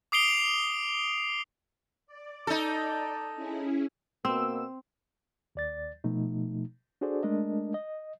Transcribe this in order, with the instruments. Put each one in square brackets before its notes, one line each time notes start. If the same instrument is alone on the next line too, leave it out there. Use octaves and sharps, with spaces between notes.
[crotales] D6 D#6 C7 D7 F7 G7
[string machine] D5
[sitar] D#4 A4
[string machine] C#4 E4 G#4
[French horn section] B2 A#3 [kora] C4 [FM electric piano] E6
[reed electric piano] D#2 D5 A6
B2 F3 A3 D#4
D4 F#4 G#4 A4 C5 D5
G#3 A3 D4 A#4 D#5
D#5